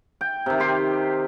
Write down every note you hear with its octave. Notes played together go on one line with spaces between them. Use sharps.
G5
C3 D#3
G4 C6